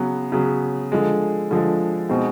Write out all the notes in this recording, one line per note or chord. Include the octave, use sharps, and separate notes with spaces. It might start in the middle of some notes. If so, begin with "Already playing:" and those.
Already playing: C#3 F#3 B3
C#3 F#3 B3
D3 F3 G#3
D3 F3 G#3
B2 G#3 C4 D#4